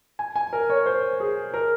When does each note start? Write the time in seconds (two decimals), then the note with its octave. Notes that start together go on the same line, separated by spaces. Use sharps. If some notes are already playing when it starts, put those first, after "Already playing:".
0.19 G#5
0.36 G#5
0.53 A#4
0.70 C#5
0.86 C5
1.20 G#4
1.54 A#4